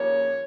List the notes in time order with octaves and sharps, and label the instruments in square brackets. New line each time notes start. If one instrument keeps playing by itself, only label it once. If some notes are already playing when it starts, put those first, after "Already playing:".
Already playing: [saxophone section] D#2 C#3 F3 A#3 C#5